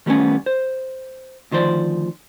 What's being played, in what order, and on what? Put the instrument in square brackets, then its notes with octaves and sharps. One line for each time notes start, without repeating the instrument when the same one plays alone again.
[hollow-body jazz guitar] D#3 G3 A3 B3 C#4
C5
D2 D#3 F3 C5 D5